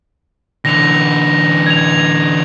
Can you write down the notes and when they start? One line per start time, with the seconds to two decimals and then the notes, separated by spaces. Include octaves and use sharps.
0.65 D3 E3 A#6 F7
1.66 G#6 F7